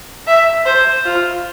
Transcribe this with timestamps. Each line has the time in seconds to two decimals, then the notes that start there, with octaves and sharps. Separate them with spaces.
0.27 E5
0.66 C5
1.06 F4